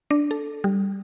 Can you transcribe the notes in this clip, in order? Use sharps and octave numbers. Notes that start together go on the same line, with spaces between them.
D4
A4
G3